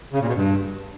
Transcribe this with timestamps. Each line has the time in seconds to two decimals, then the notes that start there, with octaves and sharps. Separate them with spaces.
0.13 C#3
0.20 A#2
0.28 B2
0.35 G2